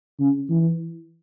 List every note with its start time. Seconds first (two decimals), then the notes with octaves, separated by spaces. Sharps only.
0.19 C#3
0.49 E3